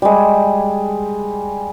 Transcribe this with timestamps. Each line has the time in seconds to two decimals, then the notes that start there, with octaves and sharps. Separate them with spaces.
0.02 G3 G#3